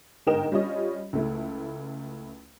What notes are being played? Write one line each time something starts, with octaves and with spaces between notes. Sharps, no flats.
G1 G#2 A#4 D#5 G5 E7
G3 C#4 F4 C#5 D#5
C#2 A3 E4